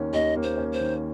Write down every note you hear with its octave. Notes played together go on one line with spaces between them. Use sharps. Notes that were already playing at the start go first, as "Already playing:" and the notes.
Already playing: D#2 D#3 A#3 C#4
D#2 D#5
A#3
C5
C#4
C5
D#3